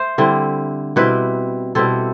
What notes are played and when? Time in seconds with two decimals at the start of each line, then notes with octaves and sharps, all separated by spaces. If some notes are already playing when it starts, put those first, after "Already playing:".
Already playing: C5 E5
0.18 D3 G3 C4 E4
0.96 B2 G3 C4 E4 B4
1.75 B2 G3 C4 E4 A4